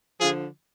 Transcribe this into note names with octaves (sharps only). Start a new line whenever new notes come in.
D3 F3 F4 G#4